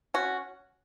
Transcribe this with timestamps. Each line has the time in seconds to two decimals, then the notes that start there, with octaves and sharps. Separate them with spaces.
0.14 C#4 F#4